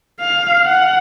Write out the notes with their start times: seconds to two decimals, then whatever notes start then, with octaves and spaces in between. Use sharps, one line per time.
0.21 F5
0.66 F#5